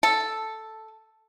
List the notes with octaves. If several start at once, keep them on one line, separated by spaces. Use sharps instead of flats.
A4